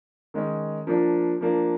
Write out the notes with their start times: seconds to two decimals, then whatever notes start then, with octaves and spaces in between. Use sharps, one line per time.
0.34 D#3 G#3 C#4
0.87 F3 A#3 D4
1.41 F3 A#3 D4